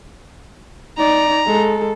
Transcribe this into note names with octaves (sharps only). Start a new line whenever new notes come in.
D#4 D5 A#5
G#3 A4